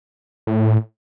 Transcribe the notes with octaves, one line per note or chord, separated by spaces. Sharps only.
A2